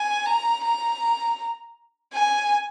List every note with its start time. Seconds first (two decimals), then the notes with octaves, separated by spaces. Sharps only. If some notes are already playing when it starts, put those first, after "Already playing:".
Already playing: G#5
0.26 A#5
0.64 A#5
2.13 G#5